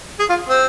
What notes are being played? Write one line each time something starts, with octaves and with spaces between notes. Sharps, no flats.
G#4
F4
C4